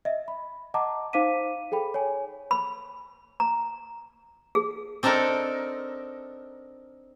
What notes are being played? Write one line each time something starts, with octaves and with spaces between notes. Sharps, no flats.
D#5 E5
B5
D#5 F#5 A5 A#5 D6
D#4 C5 F5 D6 B6 D#7
G#4 A4 G5 B5
C#5 G#5
B5
A#5
G#4
C4 D4 D#4 A4 A#4